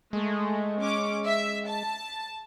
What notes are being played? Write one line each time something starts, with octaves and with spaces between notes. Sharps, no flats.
G#3 A3
C#4 D6
E5
A5